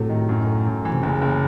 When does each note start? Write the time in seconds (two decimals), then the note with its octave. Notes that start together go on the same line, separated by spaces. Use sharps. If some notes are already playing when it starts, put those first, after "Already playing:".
Already playing: A2 C3 F#3 A3
0.09 D#3
0.29 F#2
0.46 A3
0.66 F#2
0.85 E3
0.92 C3
1.03 F#1 C#3
1.21 F#1